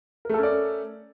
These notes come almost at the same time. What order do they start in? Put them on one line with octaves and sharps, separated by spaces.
A#4 A3 A4 C#4 D5